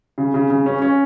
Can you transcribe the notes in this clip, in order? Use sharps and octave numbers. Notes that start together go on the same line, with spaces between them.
C#3
C#3
C#3
C#4
C#4